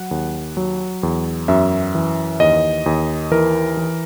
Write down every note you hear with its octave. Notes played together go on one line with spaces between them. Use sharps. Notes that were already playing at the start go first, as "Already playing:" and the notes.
Already playing: F#3 F#5
D#2
F#3
E2
F#2 E5
E3
D#2 D#5
D#2
E3 A#4
E3